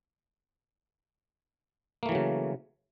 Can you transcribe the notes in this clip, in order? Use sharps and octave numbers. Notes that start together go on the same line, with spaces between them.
C#3 E3 F#3 A3 A#3